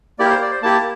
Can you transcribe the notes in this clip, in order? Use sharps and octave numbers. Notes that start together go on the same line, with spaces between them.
A#3 E4 G4 D5
A#4
C5
D5
C5
A#3 E4 G4 A5